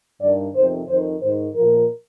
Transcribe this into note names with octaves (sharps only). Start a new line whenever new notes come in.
G2 D#3 D5
F2 C3 D#3 C5
F2 D#3 C5
G#2 D#3 C5
F3 A#4
A#2